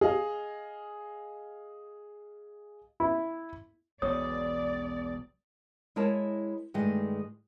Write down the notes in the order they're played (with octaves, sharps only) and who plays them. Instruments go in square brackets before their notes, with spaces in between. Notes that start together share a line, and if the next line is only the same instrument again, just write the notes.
[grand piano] G#4 D#5 F5
[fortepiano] E4
[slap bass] E1 B1 B3 [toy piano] C#5 [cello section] D5 [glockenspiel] D#6
[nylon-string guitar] G#3 E4 A#4 C#5 A5
G2 D#3 G#3 A3